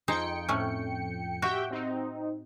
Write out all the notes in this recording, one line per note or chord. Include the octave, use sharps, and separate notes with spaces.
F2 D#4 G#4 C5 G5 C#7
A2 A3 C#4
F#4 G4 E5 G5
C4 D#4